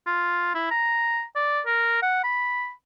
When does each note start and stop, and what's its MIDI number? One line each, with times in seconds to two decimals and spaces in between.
0.07 0.51 65
0.55 0.66 64
0.71 1.23 82
1.36 1.61 74
1.66 1.98 70
2.02 2.24 78
2.24 2.72 83